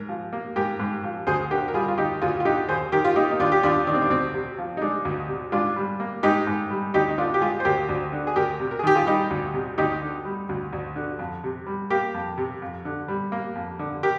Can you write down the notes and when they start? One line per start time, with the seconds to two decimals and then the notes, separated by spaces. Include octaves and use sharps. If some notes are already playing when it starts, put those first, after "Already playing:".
Already playing: G#2 A#4
0.09 F3
0.33 A#3
0.56 G#2 G4 A#4
0.80 G#2
1.04 F3
1.27 D2 G#4 C5
1.51 D3 G4 A#4
1.68 A#4
1.74 G3 F4 G#4
1.88 F4
1.98 D2 D#4 G4
2.22 D2 F4 G#4
2.40 F4
2.45 D3 D#4 G4
2.69 D#2 G#4 C5
2.92 D#3 G4 A#4
3.05 F4
3.16 A#3 D#4 G4
3.31 D#4
3.40 D#2 D4 F4
3.52 G4
3.63 D#2 D4 F4
3.87 D#3 D4
3.94 C4
4.02 D4
4.10 D2 C4
4.34 C3
4.58 F3
4.77 D#4
4.81 G#3 D4
5.05 D2
5.28 C3
5.52 G#2 D4 F4
5.76 G3
6.00 A#3
6.23 G#2 D#4 G4
6.47 G#2
6.70 G3
6.94 D2 D#4 G4
7.09 D#4
7.18 D3 D4 F4
7.34 G4
7.41 G#3 F4 G#4
7.60 C5
7.65 D2 G4 A#4
7.89 D2
8.12 D3
8.27 G#4
8.36 D2 G4 A#4
8.60 C3
8.71 A#4
8.79 G#4
8.83 D#3 G4
8.95 F4 G#4
9.07 G3 D#4 G4
9.30 D2
9.54 C3
9.78 D2 D#4 G4
10.02 D3
10.25 G3
10.49 D2
10.73 D2
10.96 D3
11.19 F2
11.44 C3
11.66 G3
11.90 A#3 G4 A#4
12.14 F2
12.38 C3
12.62 F2
12.85 D3
13.08 G3
13.32 A#3
13.55 F2
13.79 D3
14.03 G4 A#4